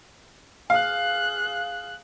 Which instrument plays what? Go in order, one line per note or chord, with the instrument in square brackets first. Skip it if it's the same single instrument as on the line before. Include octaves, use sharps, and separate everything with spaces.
[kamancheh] G#4 F#6 [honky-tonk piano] F5